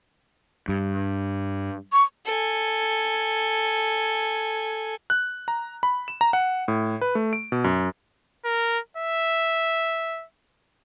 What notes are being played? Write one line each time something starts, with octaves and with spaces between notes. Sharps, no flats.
G2
C#6
A4 G#5
F#6
A#5
B5
E7
A#5
F#5
A2
B4
A3
D7
B2
F#2
A#4
E5